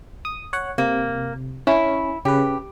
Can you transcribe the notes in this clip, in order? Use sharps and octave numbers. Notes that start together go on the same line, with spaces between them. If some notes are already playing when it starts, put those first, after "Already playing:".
D#6
C#5 F#5
C3 A#3
C#4 E4
C#3 G4 B4